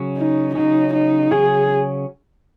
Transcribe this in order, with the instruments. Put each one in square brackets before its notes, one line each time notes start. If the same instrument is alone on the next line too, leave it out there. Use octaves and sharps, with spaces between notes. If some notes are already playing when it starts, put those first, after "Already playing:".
Already playing: [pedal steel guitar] C#3 F#3 C#4
[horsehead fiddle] D#4
[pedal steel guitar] C#3 F#3 C#4 [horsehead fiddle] D#4
[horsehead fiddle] D#4
[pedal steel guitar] C#3 F#3 C#4 [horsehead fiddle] G#4